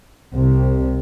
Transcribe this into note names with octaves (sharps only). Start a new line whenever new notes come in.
C2 C3